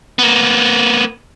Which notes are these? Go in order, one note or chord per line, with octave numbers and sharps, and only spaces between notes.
A#3 B3